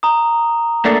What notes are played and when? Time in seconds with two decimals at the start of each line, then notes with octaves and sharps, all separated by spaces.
0.03 A#5 D#6
0.85 A3 A#3 D4